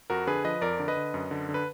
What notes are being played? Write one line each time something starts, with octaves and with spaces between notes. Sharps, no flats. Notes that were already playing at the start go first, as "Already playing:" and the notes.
F2 F#4 A#4
D3 G#4 B4
F3 B4 D#5
F2 A#4 D5
D3
B4 D#5
D3
F#2
D3
D3
B4